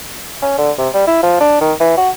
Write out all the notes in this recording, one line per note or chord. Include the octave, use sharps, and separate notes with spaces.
C#4
D3
C3
G3
E4
F3
D4
D#3
E3
F#4